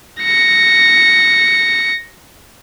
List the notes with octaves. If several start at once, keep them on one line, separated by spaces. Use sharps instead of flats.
A#6 C#7